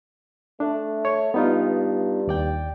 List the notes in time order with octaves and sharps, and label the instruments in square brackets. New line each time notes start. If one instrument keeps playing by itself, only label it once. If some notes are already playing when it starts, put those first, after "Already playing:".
[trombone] A3 [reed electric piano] D4
[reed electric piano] C#5
[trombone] G2 [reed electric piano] B3 D#4 F4
[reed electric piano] D#2 D5 G5